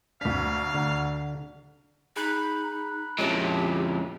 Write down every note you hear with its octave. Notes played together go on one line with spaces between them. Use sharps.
D2 D4 F5 B6
D3 F#5 A#5
D#4 G#4 B5 F#6
F2 A#2 G#3 C#4 E4 G4